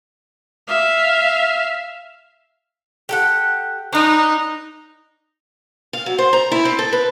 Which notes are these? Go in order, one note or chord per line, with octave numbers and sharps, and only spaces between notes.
E5 F5
G4 A4 F#5
D4 D#4 B4
F5
F#3
C5
A#5
E4
C4
A4
B4